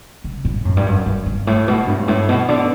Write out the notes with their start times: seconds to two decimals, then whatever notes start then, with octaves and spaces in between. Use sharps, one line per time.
0.24 C#3
0.45 A2
0.65 F#2
0.77 G2
0.86 F#2
1.06 G2
1.26 G2
1.47 A2
1.68 B2
1.87 G2
2.08 A2
2.29 B2
2.48 D3